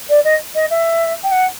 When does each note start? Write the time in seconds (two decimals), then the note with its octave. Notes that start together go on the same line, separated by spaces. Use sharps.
0.09 D5
0.24 D#5
0.55 D#5
0.70 E5
1.23 G5
1.31 F#5